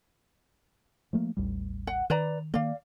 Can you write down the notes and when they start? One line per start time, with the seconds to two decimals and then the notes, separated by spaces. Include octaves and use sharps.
1.13 F3 A3 A#3
1.37 A1 D#2 G3
1.87 F#5
2.10 D#3 B4 D5 A#5
2.54 D#3 A#3 D5 F5